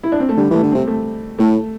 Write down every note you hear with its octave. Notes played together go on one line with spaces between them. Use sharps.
E4
D4
C4
A3
D3 G3
E3 A3
D3
C3 C4
A3
A2 A3